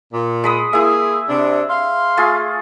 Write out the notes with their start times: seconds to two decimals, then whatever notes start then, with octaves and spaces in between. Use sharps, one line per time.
0.14 A#2
0.44 G#3 B5 D#6
0.73 A#3 E4 G#4 E5
1.29 C3 D4
1.70 F5 C6
2.17 A3 F4 G#4